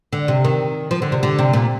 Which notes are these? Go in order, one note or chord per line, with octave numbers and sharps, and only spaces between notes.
D3
C3
D#3
F3
D3
C3
D3
C3
A#2